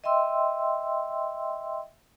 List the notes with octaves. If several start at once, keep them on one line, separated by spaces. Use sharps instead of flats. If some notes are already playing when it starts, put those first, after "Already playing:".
D#5 E5 G5 C6 E6